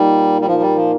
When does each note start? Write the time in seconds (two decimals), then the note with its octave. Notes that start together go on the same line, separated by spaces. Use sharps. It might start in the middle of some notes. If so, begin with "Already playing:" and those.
Already playing: A#2 G3 A#3 D#4
0.41 G3
0.47 A#2 F3 A#3 D#4
0.62 G3
0.76 F3